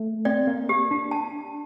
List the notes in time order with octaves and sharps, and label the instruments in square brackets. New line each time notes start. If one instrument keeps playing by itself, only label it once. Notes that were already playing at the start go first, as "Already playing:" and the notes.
Already playing: [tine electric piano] A3
[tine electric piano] C4 [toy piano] D5
[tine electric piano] A#3
[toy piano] G4
[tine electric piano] D4
[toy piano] A5